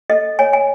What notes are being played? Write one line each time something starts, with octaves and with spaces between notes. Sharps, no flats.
A4 D#5
C#5 G#5
G#5